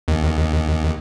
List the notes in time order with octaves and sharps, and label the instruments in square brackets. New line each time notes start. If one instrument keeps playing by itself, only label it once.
[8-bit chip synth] D#2